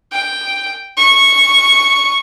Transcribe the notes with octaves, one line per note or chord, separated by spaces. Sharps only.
G5
C#6